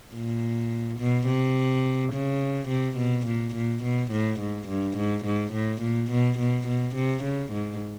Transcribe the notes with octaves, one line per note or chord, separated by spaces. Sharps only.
A#2
B2
C3
C#3
C3
B2
A#2
A#2
B2
A2
G#2
G2
G#2
G#2
A2
A#2
B2
B2
B2
C3
C#3
G#2